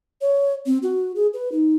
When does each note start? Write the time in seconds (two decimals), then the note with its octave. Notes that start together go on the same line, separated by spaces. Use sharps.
0.21 C#5
0.66 C4
0.83 F#4
1.15 G#4
1.34 B4
1.52 D#4